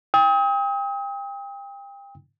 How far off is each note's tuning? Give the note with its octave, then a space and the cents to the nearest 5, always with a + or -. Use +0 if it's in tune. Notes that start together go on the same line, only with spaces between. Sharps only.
G5 +30 D#6 +40